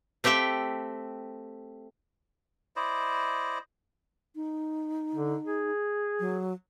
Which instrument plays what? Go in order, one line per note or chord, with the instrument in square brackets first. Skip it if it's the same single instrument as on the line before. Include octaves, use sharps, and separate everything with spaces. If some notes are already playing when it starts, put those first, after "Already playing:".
[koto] A3 C4 G4 E5 G5
[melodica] E4 C5 D5 D#5
[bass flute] D#4
[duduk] D3
G#4
[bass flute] F#3